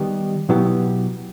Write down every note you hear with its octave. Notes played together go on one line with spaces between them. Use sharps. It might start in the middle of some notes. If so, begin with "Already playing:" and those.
Already playing: D#3 G3 B3 D#4 G4
B2 F#3 B3 E4 G4